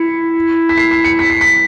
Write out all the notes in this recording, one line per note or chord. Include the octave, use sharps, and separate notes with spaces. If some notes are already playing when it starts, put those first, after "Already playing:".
Already playing: E4 C#7
B6
C7
C7
C#7
B6
C7
B6